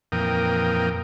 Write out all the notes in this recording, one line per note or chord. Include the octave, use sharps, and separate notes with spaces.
F2 A#2 E3 A#4 G5 D#6